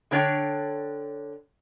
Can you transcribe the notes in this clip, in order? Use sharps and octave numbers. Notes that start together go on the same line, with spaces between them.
D3 D4 C#5 G5